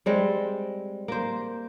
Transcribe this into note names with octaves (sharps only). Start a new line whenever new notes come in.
G3 G#3 C4
A#3 C5